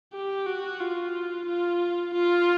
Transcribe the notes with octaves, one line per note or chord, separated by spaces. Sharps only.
G4
F#4
F4
F4
F4